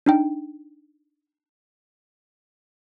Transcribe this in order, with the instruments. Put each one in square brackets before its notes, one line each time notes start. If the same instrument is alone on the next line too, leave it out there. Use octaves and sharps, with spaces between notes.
[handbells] D4 D#4 G5